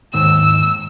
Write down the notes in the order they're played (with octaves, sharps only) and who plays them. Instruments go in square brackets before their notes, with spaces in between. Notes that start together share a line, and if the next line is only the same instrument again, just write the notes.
[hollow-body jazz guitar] D#2 G#2 D#3 [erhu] E6